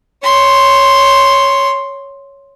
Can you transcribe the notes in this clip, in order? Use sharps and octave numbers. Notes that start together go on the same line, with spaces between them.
C#5 C6